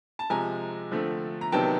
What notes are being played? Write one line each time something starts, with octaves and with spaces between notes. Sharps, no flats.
A5
C3 F3 G#3 G#5 A#5
D3 F3 A3 C4
A#5
C3 D#3 F#3 B3 G5 A5